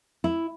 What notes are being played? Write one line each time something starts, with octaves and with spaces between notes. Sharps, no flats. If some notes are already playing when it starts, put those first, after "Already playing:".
E4